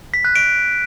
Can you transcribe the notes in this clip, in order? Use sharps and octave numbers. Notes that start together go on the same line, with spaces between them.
B6
F#6
D7